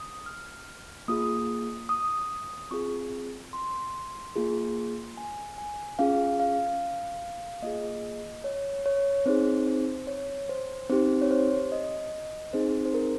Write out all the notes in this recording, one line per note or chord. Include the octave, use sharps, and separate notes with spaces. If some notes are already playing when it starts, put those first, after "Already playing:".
Already playing: D#6
F6
A#3 F4 G#4 D#6
D#6
C4 F4 G#4 C#6
C6
A#3 F4 G#4
G#5
G#5
C#4 F4 G#4 F5
F5
A#3 F4 G#4 D#5
C#5
C#5
C4 D#4 G#4 C5
C5
C#5
C5
C4 D#4 G4 C5
C#5
C5
D#5
C4 D#4 G#4 C5
C5
A#4